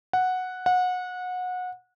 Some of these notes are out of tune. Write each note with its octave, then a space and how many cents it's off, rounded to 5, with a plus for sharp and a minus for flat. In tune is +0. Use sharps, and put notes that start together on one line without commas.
F#5 -5
F#5 -25